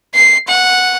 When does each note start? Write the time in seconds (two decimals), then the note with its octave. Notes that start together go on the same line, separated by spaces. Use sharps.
0.15 C7
0.48 F#5